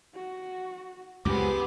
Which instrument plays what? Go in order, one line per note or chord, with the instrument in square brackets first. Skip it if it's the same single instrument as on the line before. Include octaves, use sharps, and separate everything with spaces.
[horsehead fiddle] F#4
[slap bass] C#2 F#2 [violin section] B3 C4 G#4 [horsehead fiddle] G4 [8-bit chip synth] D6